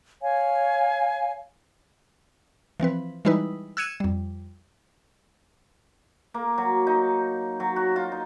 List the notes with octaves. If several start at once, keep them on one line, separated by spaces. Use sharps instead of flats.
C#5 F5 G#5
E3 F3 C4 B4
E3 G3 G#3 D#4 E4 B4
E6 F#6 G#6 C#7 D#7 E7
F2 G3
A#3
F#3
D#4
F#3
F#4
F4
D#4